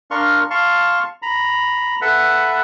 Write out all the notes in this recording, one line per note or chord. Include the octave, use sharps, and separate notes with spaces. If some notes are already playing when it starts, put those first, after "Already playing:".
D4 A#4 F5 C6 C#6
F5 A5 C6 C#6
A#5 B5
A4 B4 E5 F#5